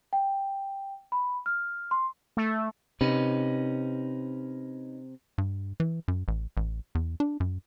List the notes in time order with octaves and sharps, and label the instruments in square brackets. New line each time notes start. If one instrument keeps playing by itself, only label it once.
[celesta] G5
B5
F6
C6
[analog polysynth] A3
[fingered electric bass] C3 [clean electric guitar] C#4 D#4 B4
[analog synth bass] G2
E3
F#2
A1
A1
E2
D4
F#2